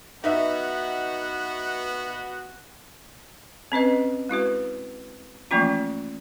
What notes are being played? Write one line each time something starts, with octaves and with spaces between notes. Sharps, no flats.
B3 D#4 F#4 E5
C4 C#4 B4 D#5
G#3 E4 F#4 B4
E3 F3 A3 A#3 C#4 F4